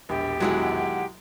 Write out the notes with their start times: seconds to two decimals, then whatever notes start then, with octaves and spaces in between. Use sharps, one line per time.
0.09 E1 A#1 G4
0.40 B2 D#3 F#3 G#3 E4 F#5